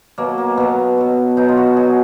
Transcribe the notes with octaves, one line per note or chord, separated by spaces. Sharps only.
B2 F#3 A#3
A#3
B2 F#3 B3
B2 F#3
B2 F#3 D#4
F4
F#4
B2 F#3 G#4